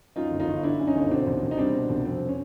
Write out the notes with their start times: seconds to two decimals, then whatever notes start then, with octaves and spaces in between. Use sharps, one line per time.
0.16 F#2 D#4 F4
0.31 G1
0.39 D#4 F4
0.48 G1
0.63 D3 D4 E4
0.79 F#2
0.87 C#4 D#4
0.95 G1
1.10 B2 C4 D4
1.27 C2
1.43 C2
1.51 D#4
1.58 G3 C4 D4
1.74 B2
1.90 C2
2.05 F2 C4
2.29 C#4